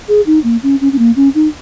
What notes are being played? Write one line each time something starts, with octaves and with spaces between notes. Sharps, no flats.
G#4
D#4
A#3
C#4
C#4
C#4
A#3
C#4
D#4